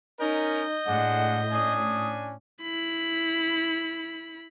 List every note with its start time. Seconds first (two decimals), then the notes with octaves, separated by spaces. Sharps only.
0.20 C#4 D#4 A#4 D#5 G6
0.86 A2 G#3 D4 F#5
1.52 C#4 D4 G#5 D#6
2.62 E4 B5